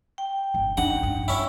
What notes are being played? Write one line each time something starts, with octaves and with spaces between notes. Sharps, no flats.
G5
G1
D4 D#4 F#5
G2
C#4 E4